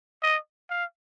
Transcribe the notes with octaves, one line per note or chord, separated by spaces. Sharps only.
D#5
F5